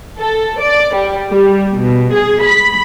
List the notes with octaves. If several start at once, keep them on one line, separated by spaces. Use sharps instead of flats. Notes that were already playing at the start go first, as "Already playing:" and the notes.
A4
D5
G3
G3
B2
G#4
B5